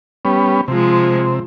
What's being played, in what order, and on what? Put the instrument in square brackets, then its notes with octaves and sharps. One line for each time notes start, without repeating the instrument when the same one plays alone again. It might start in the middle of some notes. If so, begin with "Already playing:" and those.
[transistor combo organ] G3 B3 C#4
[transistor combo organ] C3 [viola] F3 G#3